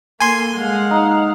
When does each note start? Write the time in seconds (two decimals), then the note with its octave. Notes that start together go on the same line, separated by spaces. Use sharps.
0.20 A#3 A4 G#5 C6
0.55 G#3 F5 F#5
0.91 D#4